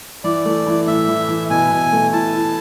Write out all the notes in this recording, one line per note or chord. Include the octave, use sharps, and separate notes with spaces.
E3 D5
A3
E3
A2 E5
E3
E3
B2 G#5
B2
A3
E4 A5
E4